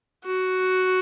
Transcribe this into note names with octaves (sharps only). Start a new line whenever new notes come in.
F#4